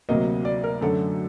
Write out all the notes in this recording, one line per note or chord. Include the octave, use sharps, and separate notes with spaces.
D2 C3 F#3 A#3 D#5
D5
A#4
F#2 D3 F#3 A3 A4